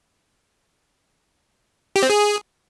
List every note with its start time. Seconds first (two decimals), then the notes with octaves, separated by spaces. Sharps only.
1.96 G4
2.03 C4
2.10 G#4